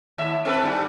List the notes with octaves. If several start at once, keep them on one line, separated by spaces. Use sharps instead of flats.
D#2 A2 E5
C4 A4 B4
G2 G3